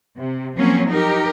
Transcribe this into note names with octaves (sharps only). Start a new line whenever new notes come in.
C3
F3 F#3 A#3 C4 C#4
D#4 G4 A#4